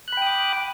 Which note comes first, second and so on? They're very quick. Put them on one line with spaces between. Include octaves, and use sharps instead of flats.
F#6 B5 G5 D#6 D6